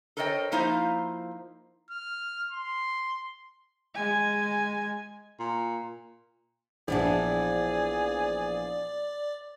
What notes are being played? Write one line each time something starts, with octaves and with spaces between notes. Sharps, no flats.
A4 A#4 C5 C#5 D#5 G5
F3 A#3 D#4 E4 C5 F5
F6
C6
G#3 G#5
A#2
A#1 E3 B3 D4 G#4 D5